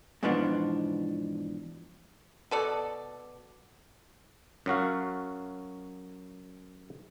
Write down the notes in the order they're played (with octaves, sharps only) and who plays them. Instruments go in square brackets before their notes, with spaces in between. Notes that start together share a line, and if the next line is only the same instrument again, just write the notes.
[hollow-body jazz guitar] G#2 B2 E3 F3 B3 D4
[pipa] B2 A4 D5
[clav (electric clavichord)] F#2 F#3 F#4 F5